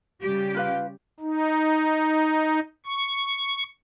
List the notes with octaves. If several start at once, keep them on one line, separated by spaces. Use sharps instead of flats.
C#3 G3 G4
F4 B4 F5
D#4
C#6